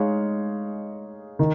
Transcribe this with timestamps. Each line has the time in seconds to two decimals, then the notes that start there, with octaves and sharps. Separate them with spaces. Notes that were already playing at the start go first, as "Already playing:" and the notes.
Already playing: G#3 D#4 G#4 C#5 F5
1.39 D#3